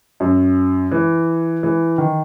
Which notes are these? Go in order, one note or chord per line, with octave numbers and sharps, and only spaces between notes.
F#2
E3
E3
D#3